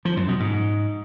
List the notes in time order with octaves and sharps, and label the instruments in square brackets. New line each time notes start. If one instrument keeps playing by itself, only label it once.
[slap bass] F3
F#2
B2
G#2